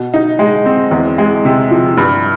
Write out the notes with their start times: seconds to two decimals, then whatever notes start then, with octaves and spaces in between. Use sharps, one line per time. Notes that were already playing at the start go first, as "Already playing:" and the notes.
Already playing: B2
0.14 D#4
0.39 G#3
0.66 C4
0.91 E2
1.18 G#3
1.45 C3
1.71 F3
1.97 G2